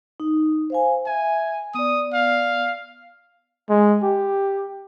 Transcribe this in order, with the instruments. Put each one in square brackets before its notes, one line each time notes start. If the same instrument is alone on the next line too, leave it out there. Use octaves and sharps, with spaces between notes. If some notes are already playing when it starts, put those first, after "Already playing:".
[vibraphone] D#4
C5 F5 G#5
[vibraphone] E5 [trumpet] G#5
[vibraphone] B3 D5 [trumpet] D#6
[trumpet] F5
[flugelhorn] G#3
G4